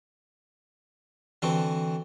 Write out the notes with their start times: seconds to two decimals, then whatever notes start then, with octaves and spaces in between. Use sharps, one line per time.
1.42 D3 E3 C4 F#4